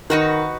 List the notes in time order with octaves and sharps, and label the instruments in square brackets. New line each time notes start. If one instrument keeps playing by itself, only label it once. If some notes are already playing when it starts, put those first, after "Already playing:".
[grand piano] D#3 [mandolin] D#4 F#4 B4